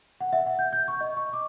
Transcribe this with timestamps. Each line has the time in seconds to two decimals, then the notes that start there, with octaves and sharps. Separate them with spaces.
0.20 F#5
0.33 E5
0.46 F#5
0.59 G6
0.73 G6
0.88 C#6
1.01 D#5
1.17 C#6
1.33 D6